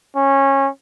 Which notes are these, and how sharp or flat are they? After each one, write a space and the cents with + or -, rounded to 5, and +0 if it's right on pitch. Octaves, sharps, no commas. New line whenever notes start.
C#4 -20